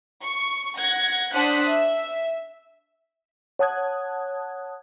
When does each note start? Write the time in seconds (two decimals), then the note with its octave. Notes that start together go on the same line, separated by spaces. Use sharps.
0.23 C#6
0.79 F#5 G#6 A#6
1.33 D4 C5 F#5 D#6 F#6 B6
1.67 E5
3.59 C#5 F#5 A5 D#6 F#6 G#6